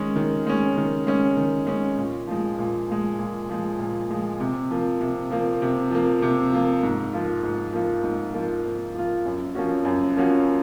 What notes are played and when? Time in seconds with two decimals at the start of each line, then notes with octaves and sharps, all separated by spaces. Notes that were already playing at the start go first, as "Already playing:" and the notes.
Already playing: D#3 G#3 C#4
0.16 D#3
0.47 G#3 C#4
0.77 D#3
1.07 G#3 C#4
1.37 D#3
1.67 G#3 C#4
1.97 A#2
2.27 F3 G#3
2.58 A#2
2.88 F3 G#3
3.19 A#2
3.50 F3 G#3
3.79 A#2
4.10 F3 G#3
4.40 C3
4.71 F3 A#3
5.01 C3
5.30 F3 A#3
5.62 C3
5.91 F3 A#3
6.22 C3
6.52 F3 A#3
6.83 G#2
7.13 F3 A#3 F4
7.43 G#2
7.73 F3 A#3 F4
8.04 G#2
8.34 F3 A#3 F4
8.64 G#2
8.95 F3 A#3 F4
9.25 F#2
9.55 F3 A#3 C#4 F#4
9.85 F#2
10.16 F3 A#3 C#4 F#4